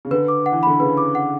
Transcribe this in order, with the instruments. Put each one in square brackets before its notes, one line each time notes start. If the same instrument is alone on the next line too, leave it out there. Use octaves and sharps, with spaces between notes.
[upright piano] C#3
[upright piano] D3 [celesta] B4
[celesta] D6
F#5
[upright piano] E3
[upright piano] D3 [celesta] B5
[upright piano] C#3 [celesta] B4
[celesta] D6
F#5